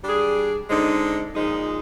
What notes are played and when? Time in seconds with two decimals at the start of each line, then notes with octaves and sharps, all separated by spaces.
0.04 G3 D4 G#4
0.70 D3 G#3 C4 D#4
1.35 A#2 F3 G#3 D#4